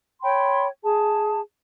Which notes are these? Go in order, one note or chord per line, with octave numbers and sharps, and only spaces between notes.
C#5 G5 B5 C6
G#4 A5